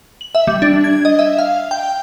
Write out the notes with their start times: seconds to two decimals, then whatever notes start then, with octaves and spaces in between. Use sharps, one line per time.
0.21 F#7
0.35 E5
0.47 G3
0.62 D4
0.84 G#6
1.05 D#5
1.19 E5
1.39 F5
1.71 G5